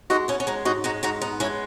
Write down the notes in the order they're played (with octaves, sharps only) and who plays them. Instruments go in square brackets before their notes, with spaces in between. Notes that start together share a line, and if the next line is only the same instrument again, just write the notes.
[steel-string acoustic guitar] G#3 D#4 F#4
B3 C#4 E4
C#4
G#3 D#4
G#2 D#4 F#4
G#3 D#4 F#4
G#2 D#4 F#4
B3 D#4
G#3 C#4 E4